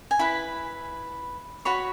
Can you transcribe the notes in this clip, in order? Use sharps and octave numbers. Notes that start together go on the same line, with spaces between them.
G#5
E4 B4 B5
F#4 C#5 B5